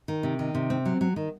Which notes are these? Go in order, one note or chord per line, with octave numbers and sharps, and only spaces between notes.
D#3
C3
D#3
C3
C4
F#3
F#3
D#3